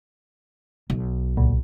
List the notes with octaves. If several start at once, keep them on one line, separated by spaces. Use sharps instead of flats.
B1
C#2 A#2